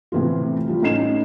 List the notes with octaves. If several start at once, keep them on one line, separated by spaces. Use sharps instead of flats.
A2 C3 E3 F3 F4
F3 G3
A2 C#4 D#4 C7 E7